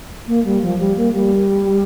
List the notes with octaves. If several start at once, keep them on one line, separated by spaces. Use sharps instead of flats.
A#3
G3
F3
G3
A#3
G3